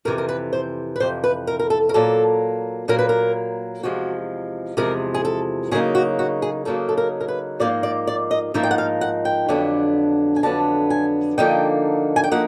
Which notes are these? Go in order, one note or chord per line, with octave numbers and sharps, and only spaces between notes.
F2 C3 E3 A#4
A#4
B4
C5
B4
F2 C3 E3 C5
B4
A#4
A#4
A4
A#4
A#2 F#3 A#3 A4
A#2 F#3 A#3 A#4
B4
A#4
E2 C3 F3 G#3 F#4
E2 C3 F3 G#3 A#4
G#4
A4
C#3 F#3 A#3 D#4 G#4
F#4
F#4
G#4
C#3 F#3 A#3 D#4 A4
A4
A#4
A#4
B4
G#2 F3 A#3 D#4 D5
D5
D5
D#5
G#2 F3 A#3 D#4 E5
G5
F#5
F5
F#5
G5
F2 D3 F#3 B3 D4
G#5
F2 D3 F#3 B3 D4 A5
G#5
D3 F3 A#3 D#4 G5
G#5
G5
F3 A#3 D#4 F#5